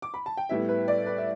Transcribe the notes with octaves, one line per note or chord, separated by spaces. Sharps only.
D6
B5
A5
G5
A2 G3 B3 E4 E5
B4
D5
B4
E5